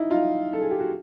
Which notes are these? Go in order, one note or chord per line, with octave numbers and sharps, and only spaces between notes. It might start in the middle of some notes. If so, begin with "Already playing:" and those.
Already playing: D#4 E4
D#4 F4
A4
G#4
G4
F#4